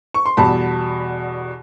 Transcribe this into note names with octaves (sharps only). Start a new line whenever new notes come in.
C#6
C6
E2 B2 G3 A5 B5